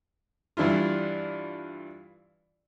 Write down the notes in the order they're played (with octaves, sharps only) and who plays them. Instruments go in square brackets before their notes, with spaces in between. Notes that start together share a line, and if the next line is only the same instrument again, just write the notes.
[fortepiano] G2 E3 D4 E4 F4